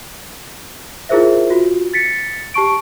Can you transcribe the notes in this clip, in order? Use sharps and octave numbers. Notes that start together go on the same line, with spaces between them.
E4 F4 G#4 A#4 C5 E5
F4 F#4
A6 B6 C#7
G4 A5 C#6 D7